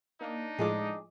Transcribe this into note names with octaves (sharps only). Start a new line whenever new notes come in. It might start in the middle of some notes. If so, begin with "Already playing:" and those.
A#3 D4 D#4
A2 F3 G#3 G#4 D#5 D6